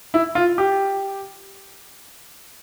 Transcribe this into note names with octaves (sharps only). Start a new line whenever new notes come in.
E4
F4
G4